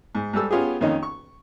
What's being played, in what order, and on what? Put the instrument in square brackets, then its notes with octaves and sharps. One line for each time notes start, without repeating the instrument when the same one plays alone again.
[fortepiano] G#2
G#2 G3 A4 E6
B3 C#4 F4 G4 G#4
F2 D#3 A#3 C#4 D#4
C#6